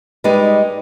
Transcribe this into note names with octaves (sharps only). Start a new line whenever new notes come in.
G3 G#3 D#4 B4 D5